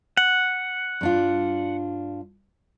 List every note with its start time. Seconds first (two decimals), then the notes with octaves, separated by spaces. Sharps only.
0.17 F#5
1.01 G2 D4 F4